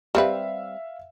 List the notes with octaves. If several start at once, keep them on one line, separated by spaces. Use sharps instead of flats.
G3 C4 B4 E5 F5